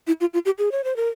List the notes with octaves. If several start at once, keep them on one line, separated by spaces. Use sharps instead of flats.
E4
F4
F4
G4
G#4
C#5
C5
A#4